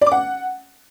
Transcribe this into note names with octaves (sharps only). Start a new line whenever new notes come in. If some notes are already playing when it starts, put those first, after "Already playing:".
D5
D6
F#5